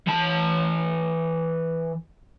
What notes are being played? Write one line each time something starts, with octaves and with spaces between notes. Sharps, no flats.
E3 A5